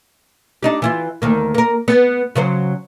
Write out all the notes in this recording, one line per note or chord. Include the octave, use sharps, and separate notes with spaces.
D4 D#4 G4
E3 E4 F4
D2 D#3 A#3
A#3 A#4
B3
C#3 F#3 C5